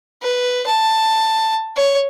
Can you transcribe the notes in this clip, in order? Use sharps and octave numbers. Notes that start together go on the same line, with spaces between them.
B4
A5
C#5